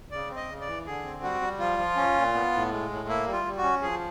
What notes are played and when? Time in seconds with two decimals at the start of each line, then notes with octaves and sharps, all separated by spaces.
0.11 C#3 D5
0.30 C4
0.36 D#5
0.49 C#3
0.61 D5
0.67 E3
0.86 D3 G#4
1.05 C4
1.23 G3 F#4
1.41 G3
1.59 F3 F4
1.78 F3
1.97 C#4
2.16 A#2
2.34 B3
2.53 A2
2.72 G#3
2.90 A2
3.08 A#3 E4
3.26 G3
3.32 F4
3.45 G3
3.58 F#4
3.63 C#4
3.82 F3 G#4